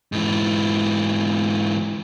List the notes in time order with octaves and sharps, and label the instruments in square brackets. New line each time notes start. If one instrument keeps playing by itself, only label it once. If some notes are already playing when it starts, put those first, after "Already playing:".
[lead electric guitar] G#2 E3